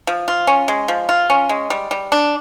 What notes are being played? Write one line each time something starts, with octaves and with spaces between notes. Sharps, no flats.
F3
F4
C#4
G#3
F3
F4
C#4
G#3
G3
G3
D4